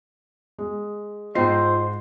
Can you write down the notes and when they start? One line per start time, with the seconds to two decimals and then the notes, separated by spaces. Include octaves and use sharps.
0.59 G#3
1.35 G#2 F4 C5 D#5 G5 C7